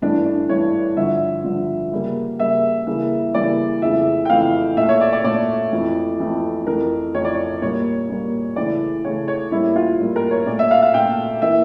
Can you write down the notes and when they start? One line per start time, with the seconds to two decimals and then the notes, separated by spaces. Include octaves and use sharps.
0.02 G2 E3 A3 D4
0.26 D4
0.49 G2 E3 A3 C#5
0.97 G2 D3 F3 E5
1.44 G2 D3 F3
1.92 C#3 G3 A#3
2.39 C#3 G3 A#3 E5
2.87 C#3 E3 G3 A#3
3.34 C#3 E3 G3 A#3 D5
3.82 F2 C#3 E3 A3 E5
4.25 G5
4.30 F2 C#3 E3 A3 F5
4.77 A#2 A3 E5
4.89 C#5
5.01 D5
5.13 D5
5.24 A#2 A3 D5
5.72 F2 E3 A3
6.19 F2 E3 A3
6.67 F2 E3 A3 A#4
7.14 F2 E3 A3 C#5
7.25 D5
7.35 C#5
7.62 A#2 G3 A#3 C#5
8.09 A#2 G3 A#3
8.56 C#3 E3 A3 D5
9.04 C#3 E3 A3 C#5
9.28 C#5
9.52 A2 G3 A#3 E4
9.76 F4
10.00 A2 G3 A#3
10.16 A#4
10.31 C#5
10.46 A#2 D5
10.51 A3
10.59 E5
10.71 F5
10.82 F5
10.94 A#2 A3 G5
11.42 E3 A#3 E5